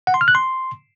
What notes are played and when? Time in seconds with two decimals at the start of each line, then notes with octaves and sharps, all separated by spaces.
0.07 F#5
0.14 C6
0.21 F6
0.28 F#6
0.35 C6